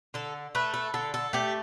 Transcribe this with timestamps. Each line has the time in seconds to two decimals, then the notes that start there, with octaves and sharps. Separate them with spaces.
0.14 D3 A4
0.55 A3 B4
0.74 A4
0.94 D3 A4
1.14 A4
1.33 A3 G4